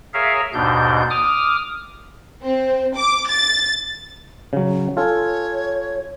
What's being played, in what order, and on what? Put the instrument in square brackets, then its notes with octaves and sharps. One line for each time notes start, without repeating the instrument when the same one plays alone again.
[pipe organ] G#4 A#4 C#5 E5 F5
D#2 G#2 B2 D4 G6
D6 D#6 F6
[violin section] C4
D6
A6
[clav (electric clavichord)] C#3 F#3
[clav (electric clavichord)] F4 A4 G#5 [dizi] C#5